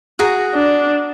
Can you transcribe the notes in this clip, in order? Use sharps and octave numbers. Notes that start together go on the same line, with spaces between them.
F#4 G#4 A#5
D4